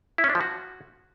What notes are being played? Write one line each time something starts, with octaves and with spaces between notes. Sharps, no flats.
E4
C#4
D4
F3
F#4